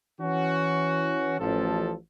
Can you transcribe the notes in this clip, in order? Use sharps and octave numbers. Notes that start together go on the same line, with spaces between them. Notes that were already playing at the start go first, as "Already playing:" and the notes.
E3 C#4 F#4
A1 F3 A4